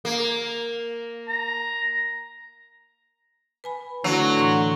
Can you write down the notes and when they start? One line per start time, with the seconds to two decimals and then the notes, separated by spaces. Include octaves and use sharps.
0.05 A#3
1.28 A#5
3.64 B4 G#5 B5
4.04 D3 F#3 A3 E4 F#4
4.35 A2 E3 C6